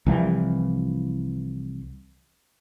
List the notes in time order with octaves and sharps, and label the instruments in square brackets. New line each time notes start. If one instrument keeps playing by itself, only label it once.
[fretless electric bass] C2 E3 F3